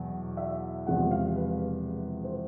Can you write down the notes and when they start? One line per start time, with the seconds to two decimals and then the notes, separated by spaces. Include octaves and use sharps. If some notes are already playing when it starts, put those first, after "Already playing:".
Already playing: E2 B2 F#3
0.37 E5
0.87 E1 E2 C3 F3 G#3 F#5
1.11 F5
1.36 B4
2.24 C5